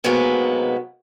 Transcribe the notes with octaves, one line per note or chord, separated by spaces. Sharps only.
G#2 C3 F#3 G#3 A#3 B3